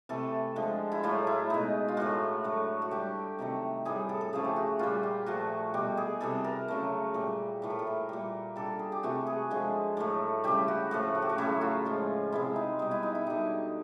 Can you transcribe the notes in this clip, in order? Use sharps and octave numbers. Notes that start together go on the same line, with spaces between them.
C3 E3 A3 A4
D3 F3 G#3
E4
A2 F#3 A3 F4
E4
B2 G#3 D#4
F4
A2 E3 A3 F#4
D3 F#3 A3
F#4
D3 G3 G4
C3 D#3 F#3 A3
A2 E3 G3 G#4
A4
A4
C#3 F3 A3 G#4
G4
F#4
A#2 G3 F4
G4
A#2 F3 A3 F#4
B2 G3 G4
G#4
C3 E3 G3 A4
A#4
C#3 F#3 A3
A#2 G3
A2 E3 A3
A#4
A4
A#4
A#2 G3
D3 G3 A4
G#4
G4
C3 E3 A3 F#4
G#4
D3 F3 G#3
A2 F#3 A3
C#3 E3 G3 G4
F#4
A2 F3 A3 F#4
F#4
G4
F#4
C#3 F#3 A3 E4
F4
A2 F3 G#3
C3 E3 G#3 E4
D#4
B2 G3 D#4
E4
D#4
E4
D3 G3 D#4